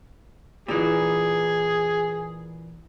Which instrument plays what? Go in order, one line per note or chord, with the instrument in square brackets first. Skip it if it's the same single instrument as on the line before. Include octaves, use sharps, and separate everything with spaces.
[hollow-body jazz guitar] A#2 E3 [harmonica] G#4